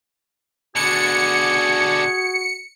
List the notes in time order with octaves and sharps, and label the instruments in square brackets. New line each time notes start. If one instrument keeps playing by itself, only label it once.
[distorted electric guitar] B2 D3 [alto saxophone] F#4 [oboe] G#4 [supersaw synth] C#7